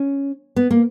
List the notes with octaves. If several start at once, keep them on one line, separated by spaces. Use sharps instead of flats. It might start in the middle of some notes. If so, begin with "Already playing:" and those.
Already playing: C#4
B3
A#3